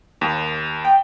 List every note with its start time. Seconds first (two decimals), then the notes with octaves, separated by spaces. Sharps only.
0.21 D#2
0.85 G5